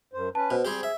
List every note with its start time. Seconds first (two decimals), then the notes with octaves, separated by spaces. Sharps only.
0.13 F#2 C5
0.35 C#4 B4 A5
0.51 B2 C5
0.65 G3 C4 G4 G#4
0.83 E5